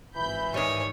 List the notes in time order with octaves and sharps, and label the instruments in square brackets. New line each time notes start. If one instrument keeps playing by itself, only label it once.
[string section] G#1 B5 G6 [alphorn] E3
[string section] G#2 G#5 [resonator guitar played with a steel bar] D#3 G3 [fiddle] C#5